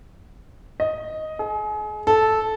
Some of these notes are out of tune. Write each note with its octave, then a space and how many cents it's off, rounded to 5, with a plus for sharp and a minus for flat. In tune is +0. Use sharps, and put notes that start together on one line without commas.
D#5 +5
G#4 +35
A4 -10